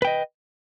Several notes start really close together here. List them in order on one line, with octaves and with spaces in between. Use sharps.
B4 G5 D#5